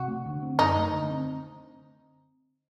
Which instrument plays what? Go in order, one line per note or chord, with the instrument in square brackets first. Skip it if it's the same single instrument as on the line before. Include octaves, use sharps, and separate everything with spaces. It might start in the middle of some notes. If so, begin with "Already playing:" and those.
Already playing: [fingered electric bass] C3 [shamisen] F#4
[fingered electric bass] A3
D3
C4
[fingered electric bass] F#2 [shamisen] D#4
[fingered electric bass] A3
D3
C4